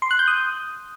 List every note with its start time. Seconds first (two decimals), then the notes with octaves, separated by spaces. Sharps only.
0.02 C6
0.11 F#6
0.19 G6
0.28 D#6